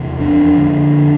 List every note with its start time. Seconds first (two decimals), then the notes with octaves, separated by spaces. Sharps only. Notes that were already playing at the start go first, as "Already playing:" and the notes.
Already playing: E2 C3
0.20 F2 D4
0.58 D3